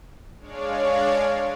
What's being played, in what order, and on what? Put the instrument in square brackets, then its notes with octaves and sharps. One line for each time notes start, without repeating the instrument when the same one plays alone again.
[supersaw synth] G#3 D4 C#5 D5 F5